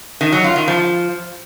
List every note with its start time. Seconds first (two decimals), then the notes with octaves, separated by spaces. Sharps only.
0.21 D#3
0.32 F#3
0.44 F4
0.56 D#3
0.68 F3